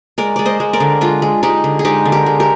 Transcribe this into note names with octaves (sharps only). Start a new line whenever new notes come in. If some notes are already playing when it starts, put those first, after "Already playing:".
G#3 A#4 D5
G#3 D5
C5 D#5
G#3
A#4 D5
D3
G#3 D4 F4
G#3
G#3 D#4 G4
D3
G#4
G#3 D#4 G4
D3
G4 A#4
G#3
G4 A#4